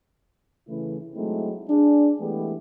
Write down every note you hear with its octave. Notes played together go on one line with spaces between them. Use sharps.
C#3 E3 A3 E4
F#3 G#3 A3 C4 D#4 E4
D4 G#4
E3 G#3 A3 B3 E4 G4